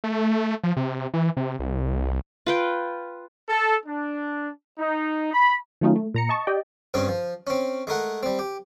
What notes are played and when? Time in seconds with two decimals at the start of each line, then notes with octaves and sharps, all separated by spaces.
0.04 A3
0.63 F3
0.77 C3
1.14 E3
1.37 C3
1.59 C2
2.46 F4 B4 G5
3.48 A4
3.86 D4
4.78 D#4
5.32 B5
5.81 D#3 F#3 A3 C#4 D#4 F4
5.96 A3
6.14 A#2 A#5 C#7
6.29 D#5 A5 C#6
6.47 G4 D5 D#5 G5
6.94 G2 C#3 C4 C#4 C#5
7.08 F3
7.47 C4 C#4
7.87 G#3 A3 A#4 F#5
8.23 G3 C4
8.39 G4